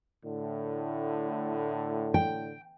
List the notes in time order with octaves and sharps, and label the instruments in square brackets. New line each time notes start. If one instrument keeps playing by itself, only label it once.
[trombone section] A2 D3
[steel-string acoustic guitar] G5